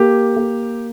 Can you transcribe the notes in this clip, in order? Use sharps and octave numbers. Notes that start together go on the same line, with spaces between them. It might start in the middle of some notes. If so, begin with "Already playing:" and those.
Already playing: A#3 G4
A#3